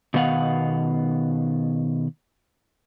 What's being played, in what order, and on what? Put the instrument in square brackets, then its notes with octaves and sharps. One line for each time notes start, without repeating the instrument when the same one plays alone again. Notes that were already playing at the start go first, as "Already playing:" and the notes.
[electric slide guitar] B2 D#3 B3 F5 F#5